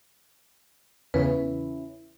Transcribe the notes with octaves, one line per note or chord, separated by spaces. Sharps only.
E2 C#3 C#4 E4 B4